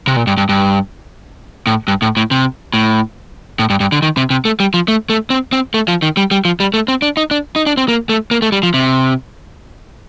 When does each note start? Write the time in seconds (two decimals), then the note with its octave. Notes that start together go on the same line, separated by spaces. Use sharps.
0.07 C3
0.16 A#2
0.27 G2
0.37 G2
0.49 G2
1.67 A2
1.88 G2
2.02 A2
2.17 A2
2.31 C3
2.74 A2
3.59 A2
3.70 G2
3.80 G2
3.92 D3
4.02 D#3
4.17 C3
4.30 C3
4.45 A3
4.60 G3
4.74 F3
4.88 A3
5.10 A3
5.30 C4
5.53 C4
5.74 A3
5.88 F3
6.02 D#3
6.17 G3
6.31 G3
6.45 F3
6.60 G3
6.74 A3
6.88 C4
7.02 D4
7.17 D#4
7.31 D4
7.56 D#4
7.66 D4
7.77 C4
7.88 A#3
8.09 A3
8.31 A#3
8.42 A3
8.52 G3
8.63 F3
8.74 C3